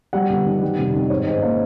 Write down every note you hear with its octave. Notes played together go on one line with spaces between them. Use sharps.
G3 F#5
G1
D#3
G3
F1
D#3
G#2 C#5
G#2
A#3